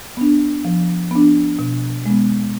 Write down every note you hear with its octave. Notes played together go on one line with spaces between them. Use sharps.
B3 D4
F3
B3 D4
B2
G#3 B3